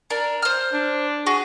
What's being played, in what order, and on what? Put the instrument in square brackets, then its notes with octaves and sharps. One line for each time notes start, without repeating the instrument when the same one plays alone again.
[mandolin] D4 A#4
C5 F6
[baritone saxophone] D4
[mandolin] F#4 [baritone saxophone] G#4